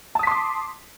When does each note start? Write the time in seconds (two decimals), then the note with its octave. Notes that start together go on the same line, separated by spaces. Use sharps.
0.15 A5
0.19 D#6
0.23 B6
0.27 C6
0.31 D6